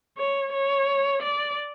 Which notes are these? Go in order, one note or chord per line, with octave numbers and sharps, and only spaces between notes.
C#5
C#5
D5